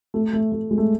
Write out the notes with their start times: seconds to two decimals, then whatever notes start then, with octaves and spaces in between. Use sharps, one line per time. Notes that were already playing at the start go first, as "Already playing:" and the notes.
0.14 A3
0.33 A3
0.52 A3
0.71 G#3
0.78 A3